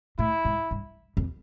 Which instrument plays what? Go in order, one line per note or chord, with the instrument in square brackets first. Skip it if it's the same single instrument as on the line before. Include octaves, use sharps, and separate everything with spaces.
[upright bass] A2 [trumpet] E4
[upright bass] G#2
G2
F2